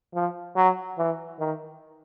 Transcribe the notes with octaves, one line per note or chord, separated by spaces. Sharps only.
F3
F#3
E3
D#3